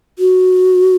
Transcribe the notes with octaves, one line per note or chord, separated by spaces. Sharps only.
F#4